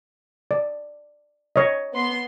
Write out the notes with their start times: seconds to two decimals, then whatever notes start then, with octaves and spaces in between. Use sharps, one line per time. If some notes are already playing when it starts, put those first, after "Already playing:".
0.51 D5
1.56 C#5 D#5
1.93 B3 C6